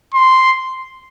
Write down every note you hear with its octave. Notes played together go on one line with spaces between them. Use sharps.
C6